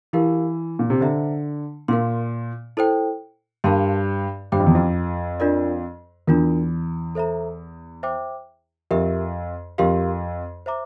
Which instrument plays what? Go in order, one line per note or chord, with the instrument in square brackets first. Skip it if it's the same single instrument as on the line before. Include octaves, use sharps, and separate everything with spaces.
[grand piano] E3 [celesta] E4 G4 A#4 F5
[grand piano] A#2
C3
[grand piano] D3 [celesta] C5 E5 A#5
[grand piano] A#2 [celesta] A#4 F5 C6
[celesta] E4 A4 C5 G5
[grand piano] G2 [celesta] A#4 F5 A5 C6
[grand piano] G2 [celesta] G4 C5 G5 D6
[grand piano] F2
E2
F2
[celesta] D4 F4 A#4 D5
[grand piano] E2 [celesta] D4 F4 A#4
[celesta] A4 C5 E5 A#5
C5 E5 G5 D6
[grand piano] F2 [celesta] G4 A#4 E5
[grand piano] F2 [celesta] G4 A#4 F5 C6
[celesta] C5 E5 A#5 D6